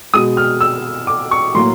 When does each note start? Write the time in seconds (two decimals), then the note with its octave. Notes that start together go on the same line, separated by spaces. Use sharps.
0.13 G#3 D#6
0.16 B2
0.37 F6
0.60 E6
1.07 D6
1.31 C#6
1.55 A2 F#3 A#3 C6